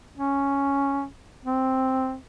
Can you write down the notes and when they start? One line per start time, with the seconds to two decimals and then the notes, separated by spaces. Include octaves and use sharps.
0.17 C#4
1.45 C4